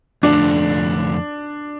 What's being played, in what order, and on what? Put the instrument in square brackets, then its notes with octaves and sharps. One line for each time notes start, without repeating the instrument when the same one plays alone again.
[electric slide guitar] F2 D3 A3 [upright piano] D4 D5